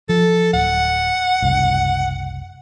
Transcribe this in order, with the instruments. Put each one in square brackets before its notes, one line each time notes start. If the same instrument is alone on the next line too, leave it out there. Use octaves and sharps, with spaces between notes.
[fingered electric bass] F3 [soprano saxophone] A4
[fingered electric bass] D1 [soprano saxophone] F#5
[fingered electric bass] F#1 C2